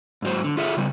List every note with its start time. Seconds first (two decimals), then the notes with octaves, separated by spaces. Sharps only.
0.22 G#2 F#3 C5
0.44 D3
0.57 F4 G#4 A4 E5
0.77 C#3 G3